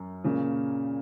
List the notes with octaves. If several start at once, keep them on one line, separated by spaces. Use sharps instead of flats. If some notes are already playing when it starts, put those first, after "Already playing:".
Already playing: F#2
A#2 C#3